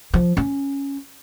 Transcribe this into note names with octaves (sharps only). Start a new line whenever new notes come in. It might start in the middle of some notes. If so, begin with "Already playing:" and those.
F3
C#4